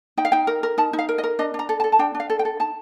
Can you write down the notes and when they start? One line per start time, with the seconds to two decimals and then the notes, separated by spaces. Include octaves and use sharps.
0.17 D#4 G5
0.25 F5
0.32 D#4 G5
0.47 A#4
0.63 A#4
0.78 D#4 A5
0.93 D#4
0.99 F5
1.09 A#4
1.18 D#5
1.24 A#4
1.39 D4 D#5
1.54 D4
1.59 A#5
1.69 A4
1.80 A5
1.84 A4
1.92 A5
1.99 D4 G5
2.15 D4
2.20 F5
2.30 A4
2.39 G5
2.45 A4
2.60 D#4 A5